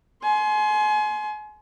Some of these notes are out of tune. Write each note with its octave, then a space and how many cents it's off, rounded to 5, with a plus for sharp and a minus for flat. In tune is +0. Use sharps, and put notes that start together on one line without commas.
G#5 +35 C6 +0